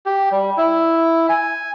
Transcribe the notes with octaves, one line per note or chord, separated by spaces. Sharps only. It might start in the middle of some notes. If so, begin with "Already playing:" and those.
G4
G3
E4
G#5